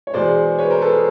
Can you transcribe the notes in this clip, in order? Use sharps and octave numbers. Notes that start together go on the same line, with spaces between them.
C#5
E2 B2 G#3 C5 D5
B4 C#5
A#4 C5
A4 B4
G#4 A#4